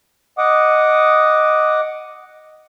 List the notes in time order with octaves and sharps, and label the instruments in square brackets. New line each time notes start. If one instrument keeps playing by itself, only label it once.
[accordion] D#5 F#5 D6 D#6